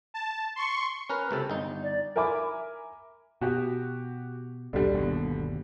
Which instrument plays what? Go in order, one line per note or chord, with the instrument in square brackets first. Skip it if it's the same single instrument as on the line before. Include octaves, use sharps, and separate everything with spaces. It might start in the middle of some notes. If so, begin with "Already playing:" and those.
[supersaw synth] A5
C6 C#6 C#7
[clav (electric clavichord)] C#4 A#4 B4
C#2 C3 A4
G1 D#4
[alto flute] D5
[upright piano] A#4 E5 G#5 B5 D6
[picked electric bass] B2 [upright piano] F#4 G4
[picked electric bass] E1 C2 [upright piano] D3 G3
[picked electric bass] G1 D#2 B2